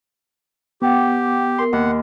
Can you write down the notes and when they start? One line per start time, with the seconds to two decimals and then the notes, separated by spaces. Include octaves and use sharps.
0.82 B3 G4 F#5 G5 D6
1.58 A#4 C6 C7
1.73 D#2 F#5